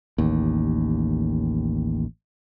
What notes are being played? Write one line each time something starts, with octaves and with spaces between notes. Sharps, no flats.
A1 D#2